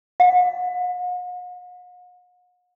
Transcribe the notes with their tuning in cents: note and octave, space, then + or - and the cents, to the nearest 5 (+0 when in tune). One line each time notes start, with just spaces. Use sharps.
F#5 -45